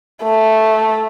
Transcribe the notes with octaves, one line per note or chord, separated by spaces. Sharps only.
A3